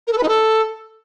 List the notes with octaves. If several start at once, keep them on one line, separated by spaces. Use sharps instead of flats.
A#4
A4
B4
D#4
A4